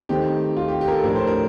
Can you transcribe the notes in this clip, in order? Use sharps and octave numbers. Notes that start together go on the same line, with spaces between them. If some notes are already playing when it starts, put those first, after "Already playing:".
D#3 A3 C4 D#4 G4
F4
G4
G4
A#4
A4
A2 F3 A3 D4 A#4
C5
A#4